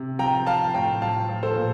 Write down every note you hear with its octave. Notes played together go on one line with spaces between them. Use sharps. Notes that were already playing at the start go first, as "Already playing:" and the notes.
Already playing: C3
F3 G5 A#5
F3 F5 A5
A2 G5 A#5
F3 F5 A5
F3
A4 C5
A#2